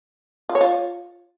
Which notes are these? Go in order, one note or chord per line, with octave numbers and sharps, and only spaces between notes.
F4
C#5
F4